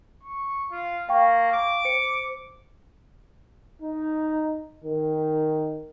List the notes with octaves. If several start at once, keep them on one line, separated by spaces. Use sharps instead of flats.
C#6
F4
A#3 F5 G5 C#6
D6
C5 C#7
D#4
D#3